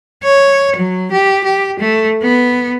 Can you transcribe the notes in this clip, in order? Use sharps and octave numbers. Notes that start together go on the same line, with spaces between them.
C#5
F#3
G4
G4
A3
B3